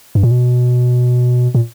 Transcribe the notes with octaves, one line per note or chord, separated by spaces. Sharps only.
G2
A#2
B2
A#2